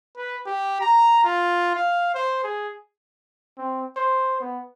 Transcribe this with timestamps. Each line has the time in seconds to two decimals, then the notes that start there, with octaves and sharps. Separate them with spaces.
0.17 B4
0.46 G4
0.81 A#5
1.24 F4
1.75 F5
2.14 C5
2.44 G#4
3.58 C4
3.96 C5
4.41 B3